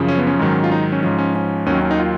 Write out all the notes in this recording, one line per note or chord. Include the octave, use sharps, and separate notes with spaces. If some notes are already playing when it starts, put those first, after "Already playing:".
Already playing: F#2 C#3 F3
C#4
B3
C#4
G#2 D#3 F#3
F4
D#4
C#4
G#2 F3 C#4
C#4
C#4
D#2 D#3 F#3 C#4
C#4
D#4
F4